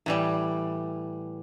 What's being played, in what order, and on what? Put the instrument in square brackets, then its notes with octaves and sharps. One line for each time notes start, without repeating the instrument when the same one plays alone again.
[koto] A2 E3 G3